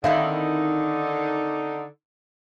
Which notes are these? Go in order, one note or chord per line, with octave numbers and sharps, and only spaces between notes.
D3 D#3 C4 D#4 E4 E5 F5